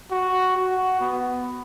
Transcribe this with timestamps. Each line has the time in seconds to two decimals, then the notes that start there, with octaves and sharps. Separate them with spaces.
0.11 F#4
0.56 F#4
1.00 B3